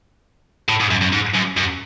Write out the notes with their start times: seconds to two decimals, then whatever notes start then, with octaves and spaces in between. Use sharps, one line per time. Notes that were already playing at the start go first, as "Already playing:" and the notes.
0.69 A2
0.80 G#2
0.91 F#2
1.02 F#2
1.13 G#2
1.35 F#2
1.57 F#2